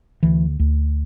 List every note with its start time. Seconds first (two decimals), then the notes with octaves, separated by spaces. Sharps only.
0.23 D2 E3
0.59 D2